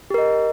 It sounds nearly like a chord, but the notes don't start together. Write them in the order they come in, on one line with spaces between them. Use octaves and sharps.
G4 A#4 D#5